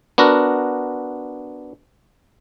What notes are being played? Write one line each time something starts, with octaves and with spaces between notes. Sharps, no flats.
B3 D4 F#4 A#4